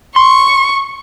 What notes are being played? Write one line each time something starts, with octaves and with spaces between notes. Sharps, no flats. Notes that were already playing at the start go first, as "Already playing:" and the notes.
C6 C#6